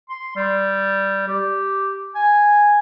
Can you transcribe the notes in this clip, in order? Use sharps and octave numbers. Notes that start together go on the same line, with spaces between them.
C6
G3
G4
G#5